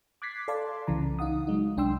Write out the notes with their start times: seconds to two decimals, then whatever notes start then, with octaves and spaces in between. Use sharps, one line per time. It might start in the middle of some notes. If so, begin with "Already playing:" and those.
0.22 D6 F#6 G#6 A6 B6 C7
0.48 A4 D5 F5 A5 C6 D6
0.87 C2 C#3 E3 A#5
1.19 D#4 F5 F#5 D#6
1.47 F#3 G#3 D#4
1.77 C2 D4 G5 C6 E6